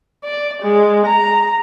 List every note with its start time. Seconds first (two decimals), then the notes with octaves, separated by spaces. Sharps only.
0.24 D5
0.63 G#3
1.06 A#5